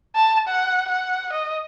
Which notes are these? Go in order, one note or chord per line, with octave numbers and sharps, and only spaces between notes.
A5
F#5
F#5
D#5